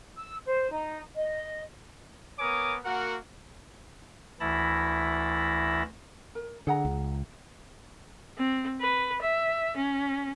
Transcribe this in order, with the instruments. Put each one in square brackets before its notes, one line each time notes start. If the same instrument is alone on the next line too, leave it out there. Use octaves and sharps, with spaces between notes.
[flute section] E6
C5
D#4
D#5
[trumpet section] B3 A#4 C#5 G#5 D6 D#6
A#3 F#4 A#4 F#5
[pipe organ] D2 E3 E4 A5 B5 A#6
[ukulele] A#4
[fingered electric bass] D3 [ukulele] G#4 F#5 A#5
[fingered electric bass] C#2
[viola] C4
B4
E5
C#4